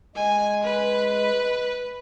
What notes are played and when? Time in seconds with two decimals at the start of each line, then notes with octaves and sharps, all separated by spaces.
0.16 G#3 G#5
0.64 B4